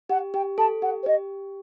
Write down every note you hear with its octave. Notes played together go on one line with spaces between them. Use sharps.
G4 F#5
G4 G5
A4 A5
G4 F#5
C5
G4 D#5